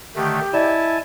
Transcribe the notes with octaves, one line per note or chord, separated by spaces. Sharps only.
D3 D#3 A3 G4
E4 D5 D#5 G#5 A5